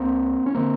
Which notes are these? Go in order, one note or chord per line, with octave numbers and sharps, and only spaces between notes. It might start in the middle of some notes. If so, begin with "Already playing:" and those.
Already playing: C#2 A#3 C4
C#4
D3 A#3 C4